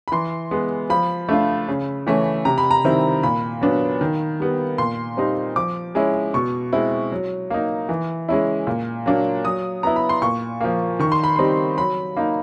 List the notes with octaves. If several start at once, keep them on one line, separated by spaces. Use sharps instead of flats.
B5
E3 C6
G#3 B3
F3 B5
A3 D4 F4
C#3
E3 A3 C#4
C3 A#5
B5
A#5
D#3 G3 C4 E4
A#2 B5
F#3 B3 D4
D#3
G3 B3
A#2 C6
G3 C4 D#4
F3 D6
G#3 C#4 E4
B2 C#6
G#3 C4 E4
F#3
A#3 D#4
E3
G#3 C#4 E4
A#2
F#3 A#3 D4
F#3 D#6
B3 E4 A#5
B5
C6
A#2 C#6
F3 A#3
D#3 C#6
C6
B5
G3 C4 D#4 C6
F#3 B5
A#3 D#4